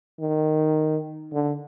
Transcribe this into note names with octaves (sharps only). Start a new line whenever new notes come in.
D#3
D3